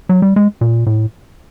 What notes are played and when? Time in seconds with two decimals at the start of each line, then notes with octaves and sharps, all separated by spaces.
0.09 F#3
0.22 G3
0.36 G#3
0.61 A#2
0.86 A2